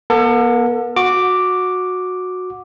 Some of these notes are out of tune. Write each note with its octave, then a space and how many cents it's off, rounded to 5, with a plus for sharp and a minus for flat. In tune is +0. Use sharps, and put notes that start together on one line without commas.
B3 -45 A4 +30
F#4 -15 D6 +0